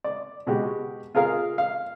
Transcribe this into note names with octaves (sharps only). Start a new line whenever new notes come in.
D5
B2 G#3 F#4 G4
F4 G#4 A#4 F5
F5